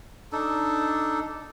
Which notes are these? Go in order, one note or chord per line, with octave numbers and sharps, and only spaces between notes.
D4 D#4 A4